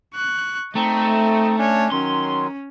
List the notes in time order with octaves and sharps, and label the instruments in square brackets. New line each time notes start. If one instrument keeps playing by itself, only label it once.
[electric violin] C#6 F#6
[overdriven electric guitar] A3 [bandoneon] C4 D#4 [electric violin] D#5
[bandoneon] C#4 D4 [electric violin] C#5
[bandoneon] D#3 F#3 [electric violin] C#4 [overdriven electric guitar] C6